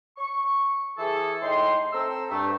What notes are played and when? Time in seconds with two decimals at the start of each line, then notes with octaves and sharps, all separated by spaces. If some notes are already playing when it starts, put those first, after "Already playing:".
0.17 C#6
0.98 E3 G#4 A4
1.42 A2 D#4 G5 C6
1.93 C4 A4 A#5 E6
2.30 G2 A3